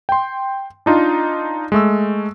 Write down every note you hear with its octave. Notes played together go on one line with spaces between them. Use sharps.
G5 C6
D4 D#4 F4
G#3 A3 E6